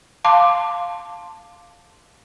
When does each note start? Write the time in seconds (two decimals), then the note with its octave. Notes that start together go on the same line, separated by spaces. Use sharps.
0.25 F5 A5 C6 D6